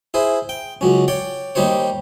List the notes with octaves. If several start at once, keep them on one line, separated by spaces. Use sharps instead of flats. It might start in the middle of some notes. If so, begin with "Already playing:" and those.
E4 G#4 C5
G5
C#2 F#3 C#4
C#5 D5 G5
D#2 G3 D#4 G4 C5 C#5